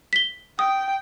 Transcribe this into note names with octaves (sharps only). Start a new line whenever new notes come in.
B6 G7
G5 D#6